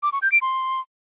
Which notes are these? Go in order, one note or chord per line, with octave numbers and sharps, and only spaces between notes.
D6
C#6
G6
D7
C6